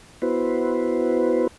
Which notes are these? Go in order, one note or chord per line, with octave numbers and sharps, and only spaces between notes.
B3 E4 F#4 B4 C5